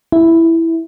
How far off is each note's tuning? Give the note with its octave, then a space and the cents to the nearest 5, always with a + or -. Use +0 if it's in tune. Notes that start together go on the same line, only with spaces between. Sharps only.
E4 +0